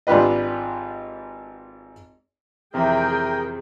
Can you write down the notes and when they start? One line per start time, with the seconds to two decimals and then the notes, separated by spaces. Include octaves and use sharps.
0.07 G#1 D4 F4 G4 B4 D#5
2.74 F2 C3 E3 G#4 A#4 E5 G5